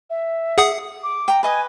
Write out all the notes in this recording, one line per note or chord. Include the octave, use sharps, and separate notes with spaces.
E5
G#4 F#5 D#6
D6
G5 A#5
B4 D#5 G#5 D#6